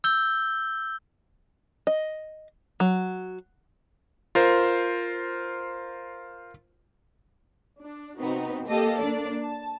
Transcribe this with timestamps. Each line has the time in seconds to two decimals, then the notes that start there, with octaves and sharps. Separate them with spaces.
0.04 E6 G6 G7
1.87 D#5
2.80 F#3
4.35 F4 A#4 C5
7.80 D4
8.18 C3 B3 C4 D#4 F#4
8.66 A#3 G4 A4 D#5 F5 A5
8.99 A#3 D4 D5
9.43 A5